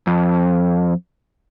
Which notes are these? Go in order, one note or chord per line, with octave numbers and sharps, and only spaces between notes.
F2